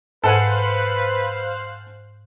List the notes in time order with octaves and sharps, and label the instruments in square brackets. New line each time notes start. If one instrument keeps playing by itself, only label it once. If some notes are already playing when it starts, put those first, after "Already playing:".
[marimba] G#2 [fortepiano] A4 F#5 G#5 [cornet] B4 [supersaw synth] C5 F5 F#6